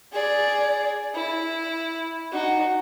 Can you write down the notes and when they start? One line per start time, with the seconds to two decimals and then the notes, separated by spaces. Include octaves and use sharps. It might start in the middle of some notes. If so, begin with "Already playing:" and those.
0.13 G#4 D5
1.14 E4
2.32 D#4 F#4